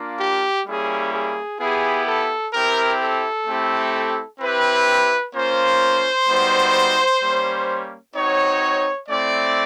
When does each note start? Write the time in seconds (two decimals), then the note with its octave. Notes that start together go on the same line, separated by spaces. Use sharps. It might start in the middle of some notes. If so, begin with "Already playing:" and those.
Already playing: A#3 D4 F4
0.19 G4
0.66 G3 A#3 C#4 E4 G#4
1.12 G#4
1.59 B3 E4 G4 G#4
2.06 A4
2.53 C4 E4 G4 A#4
3.00 A4
3.47 A3 C4 E4 G4
4.40 C4 E4 G4 B4
5.34 A#3 C#4 F4 C5
6.28 G3 B3 D#4 F#4
7.22 G3 A#3 C#4
8.15 C4 D#4 F#4 C#5
9.08 A3 C4 E4 D5